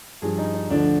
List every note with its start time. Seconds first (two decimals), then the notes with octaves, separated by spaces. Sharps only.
0.22 G2 F3 G#4
0.38 D#4
0.54 D#4
0.69 D2 D3 F3 D4